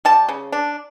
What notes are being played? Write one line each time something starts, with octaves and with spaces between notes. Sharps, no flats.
G3 A5
C#3
D4